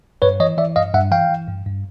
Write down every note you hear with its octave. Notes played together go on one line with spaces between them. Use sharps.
G2 B4 C#5
E3 C#5 D#5
E3 D5 E5
G2 D#5 F5
G2 E5 F#5
E3 F5 G5
E3
G2
G2